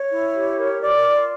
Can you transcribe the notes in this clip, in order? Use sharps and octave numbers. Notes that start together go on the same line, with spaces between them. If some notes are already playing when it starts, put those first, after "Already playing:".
Already playing: C#5
E4
G4
A#4
F4 D5
F4